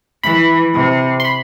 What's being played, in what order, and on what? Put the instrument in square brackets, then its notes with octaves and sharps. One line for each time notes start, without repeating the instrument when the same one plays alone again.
[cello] E3 [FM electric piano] B5
[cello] C3
[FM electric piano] C6
B5